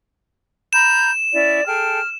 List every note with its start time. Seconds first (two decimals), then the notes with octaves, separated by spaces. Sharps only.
0.73 A#5 B5 G6 E7
1.33 C#4 E4 D5
1.66 G#4 A4 G5 F6